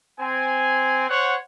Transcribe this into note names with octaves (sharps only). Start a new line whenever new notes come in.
C4 G#5
C5 C#5 F#5